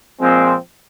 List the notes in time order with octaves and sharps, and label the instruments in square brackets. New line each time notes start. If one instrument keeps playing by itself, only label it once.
[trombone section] A#2 F3 G#3 C4